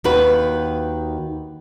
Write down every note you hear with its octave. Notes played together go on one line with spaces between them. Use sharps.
D#2 D#3 F#4 B4